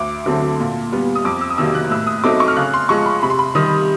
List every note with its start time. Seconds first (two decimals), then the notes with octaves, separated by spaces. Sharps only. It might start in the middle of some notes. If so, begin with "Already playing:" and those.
Already playing: D2 D6
0.26 D3 F#3 A3 C4
0.60 A#2
0.92 G3 B3
1.15 D#6
1.25 F2 D6
1.41 E6
1.50 D#6
1.58 C3 D#3 F#3 A#3 E6
1.75 F#6
1.90 A2 E6
2.07 D#6
2.24 F#3 A3 C4 D#4 D6
2.40 C#6
2.48 F6
2.56 C#3 F#6
2.74 C6
2.89 F3 G#3 C#6
3.06 B5
3.23 C3 B5
3.30 C6
3.39 B5
3.55 D#3 G3 D#6